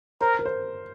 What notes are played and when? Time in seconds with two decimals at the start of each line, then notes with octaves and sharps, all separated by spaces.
0.21 A#4 C5
0.39 A#4
0.45 C5